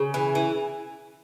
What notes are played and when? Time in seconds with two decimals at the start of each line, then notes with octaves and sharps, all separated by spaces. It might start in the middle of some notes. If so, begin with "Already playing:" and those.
Already playing: C#3
0.14 E3
0.35 E3